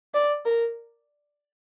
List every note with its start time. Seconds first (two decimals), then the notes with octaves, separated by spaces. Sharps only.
0.14 D5
0.45 A#4